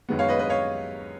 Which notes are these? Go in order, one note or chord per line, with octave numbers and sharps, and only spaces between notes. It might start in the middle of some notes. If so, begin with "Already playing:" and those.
F#2 D#3 G#3 B3
C#5 F5
B4 D#5
B4 D#5
C#5 F5